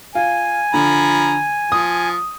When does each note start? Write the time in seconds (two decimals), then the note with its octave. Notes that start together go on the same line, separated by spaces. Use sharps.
0.15 F4 G#5
0.74 D3 F3 A#5 B5
1.72 F3 D#6